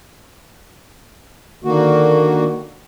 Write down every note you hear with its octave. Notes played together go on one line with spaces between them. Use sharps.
D3 D#3 A#3 F#4